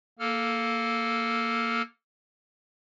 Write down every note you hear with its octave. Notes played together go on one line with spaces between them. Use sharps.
A#3 A4 F6